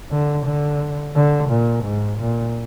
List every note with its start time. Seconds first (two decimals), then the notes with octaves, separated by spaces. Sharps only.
0.11 D3
0.45 D3
1.15 D3
1.50 A#2
1.84 G#2
2.19 A#2